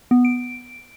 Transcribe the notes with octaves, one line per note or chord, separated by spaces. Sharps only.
B3
D7